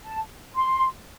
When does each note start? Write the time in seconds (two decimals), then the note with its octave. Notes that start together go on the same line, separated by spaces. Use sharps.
0.04 A5
0.54 C6